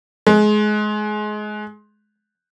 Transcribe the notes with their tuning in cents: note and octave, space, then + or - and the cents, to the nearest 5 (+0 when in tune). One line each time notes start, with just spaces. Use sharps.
G#3 +25